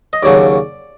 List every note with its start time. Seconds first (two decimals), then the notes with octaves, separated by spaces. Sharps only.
0.13 D#5
0.23 D#2 C#3 F#3 D5